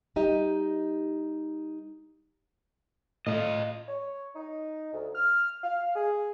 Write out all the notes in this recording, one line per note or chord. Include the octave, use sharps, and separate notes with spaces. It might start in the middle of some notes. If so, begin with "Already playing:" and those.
G3 D#4 G4 D#5
A2 A3 F4 D#5
C#5
D#4
D2
F6
F5
G#4